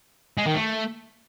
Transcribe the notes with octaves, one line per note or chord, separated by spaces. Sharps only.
G#3
D#3
A3